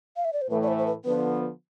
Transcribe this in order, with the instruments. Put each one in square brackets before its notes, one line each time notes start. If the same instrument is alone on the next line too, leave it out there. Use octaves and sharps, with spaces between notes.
[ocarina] F5
E5
D5
C5
[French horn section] A2 E3 A3 [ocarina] B4
[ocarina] D5
C5
C5
B4
[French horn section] D3 F3 B3 [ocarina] B4